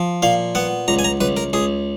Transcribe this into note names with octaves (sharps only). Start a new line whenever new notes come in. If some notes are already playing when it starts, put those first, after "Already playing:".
Already playing: F3
A#2 F5
B3 F#5
C#2 A#5
G#5
A#5
C#2 B4
A#4
C#2 G#4